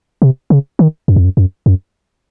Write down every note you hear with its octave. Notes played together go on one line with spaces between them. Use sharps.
C3
C#3
D#3
F#2
F2
F#2
F#2
F#2